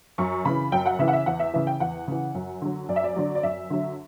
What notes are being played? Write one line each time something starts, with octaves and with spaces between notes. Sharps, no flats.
F#2 C#6
C#3 E3 B5
F#2 G5
F#5
C#3 E3 E5
F#5
E5
E2 F#5
E5
C#3 E3 E5
G5
E2 F#5
C#3 E3
F#2
D3 F#3
F#2 D5
E5
D5
D3 F#3
D5
F#2 E5
D3 F#3